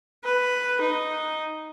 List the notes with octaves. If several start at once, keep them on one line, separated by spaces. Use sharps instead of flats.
B4
D#4